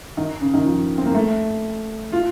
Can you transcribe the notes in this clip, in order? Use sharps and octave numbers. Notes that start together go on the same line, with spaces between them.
D#3
C#3
D#3
F3
C4
A#3
A3
F4